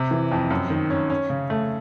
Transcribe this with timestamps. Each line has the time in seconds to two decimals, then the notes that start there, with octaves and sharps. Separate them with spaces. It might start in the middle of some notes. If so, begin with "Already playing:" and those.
Already playing: C3
0.11 E3
0.32 F2
0.50 F#2
0.70 D#3
0.90 C#4
1.10 C#4
1.30 C#3
1.50 A3